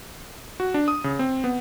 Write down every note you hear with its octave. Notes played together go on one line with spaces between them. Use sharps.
F#4
D4
D#6
C#3
C4
B3